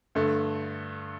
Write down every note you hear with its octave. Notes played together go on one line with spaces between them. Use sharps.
G2 D3 A3